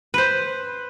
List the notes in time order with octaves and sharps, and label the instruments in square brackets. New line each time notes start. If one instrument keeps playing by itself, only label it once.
[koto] B4 C5